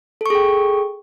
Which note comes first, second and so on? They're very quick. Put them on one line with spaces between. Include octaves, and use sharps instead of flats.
A4 C#6 G#4 G5